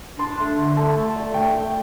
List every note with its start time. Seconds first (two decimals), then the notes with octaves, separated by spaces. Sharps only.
0.19 D4 C6
0.39 A3
0.58 D3
0.77 A3 A5
0.97 A3
1.15 D3
1.34 A3 G5
1.53 A3